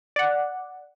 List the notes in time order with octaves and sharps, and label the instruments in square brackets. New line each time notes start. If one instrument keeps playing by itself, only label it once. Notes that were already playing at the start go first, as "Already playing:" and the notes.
[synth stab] D5 F#5